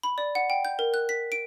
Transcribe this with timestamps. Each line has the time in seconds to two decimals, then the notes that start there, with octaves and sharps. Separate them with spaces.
0.03 B5
0.18 D5
0.35 F#5
0.50 G5
0.65 G6
0.79 A#4
0.94 F#6
1.09 B6
1.32 D7